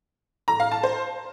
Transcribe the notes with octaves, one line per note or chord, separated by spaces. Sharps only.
A#5
F5
A5
C5